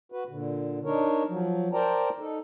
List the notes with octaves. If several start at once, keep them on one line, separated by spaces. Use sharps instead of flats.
F#4 B4
A#2 D3
D4 D#4 A#4 C#5
F3 F#3
A#4 C5 D5 G5 A5 A#5
D#4 A4